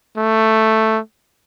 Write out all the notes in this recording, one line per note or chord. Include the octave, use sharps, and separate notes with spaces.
A3